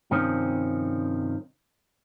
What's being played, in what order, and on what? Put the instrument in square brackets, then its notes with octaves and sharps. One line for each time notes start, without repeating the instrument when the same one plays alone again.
[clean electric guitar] G2 C3 D#3 F3 C4 C#4